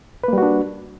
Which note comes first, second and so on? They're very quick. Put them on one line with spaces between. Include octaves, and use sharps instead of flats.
B4 A#3 G3 F#4 D4